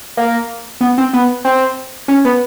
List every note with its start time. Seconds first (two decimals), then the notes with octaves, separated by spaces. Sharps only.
0.17 A#3
0.81 B3
0.98 C4
1.13 B3
1.45 C4
2.08 C#4
2.25 B3